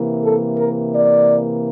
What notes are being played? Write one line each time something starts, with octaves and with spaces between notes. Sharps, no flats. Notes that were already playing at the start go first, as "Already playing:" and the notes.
Already playing: C3 E3 A#3
A4
A#4
D5